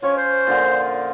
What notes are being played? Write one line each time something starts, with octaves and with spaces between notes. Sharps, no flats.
F3 C#4 C#5
C5
A#2 D3 F3